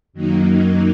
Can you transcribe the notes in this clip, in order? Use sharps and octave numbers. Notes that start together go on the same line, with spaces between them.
F#2 D#3 F#3 A#3 D#4